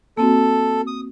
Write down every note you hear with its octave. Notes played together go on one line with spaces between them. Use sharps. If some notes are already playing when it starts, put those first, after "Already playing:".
A#3 C4 F#4 A4
D#6